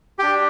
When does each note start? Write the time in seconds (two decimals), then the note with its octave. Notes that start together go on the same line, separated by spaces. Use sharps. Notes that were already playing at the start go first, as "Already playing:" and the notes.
0.19 D4 G4 G5